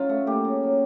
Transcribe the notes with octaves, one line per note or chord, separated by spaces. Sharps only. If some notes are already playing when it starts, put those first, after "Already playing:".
Already playing: C#3 F#3 F4
A3
A#3 G4
C#3
F#3